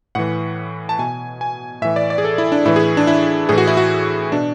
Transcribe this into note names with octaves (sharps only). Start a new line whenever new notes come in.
A2 E3 F#5
A5
B2 G#5
G#5
A2 E3 E5
D5
D5
G#4
A4
E4
D4
A2 E3 E4
G#4
D4
E4
A2 E3 G#4
F#4
E4
F#4
B2 D4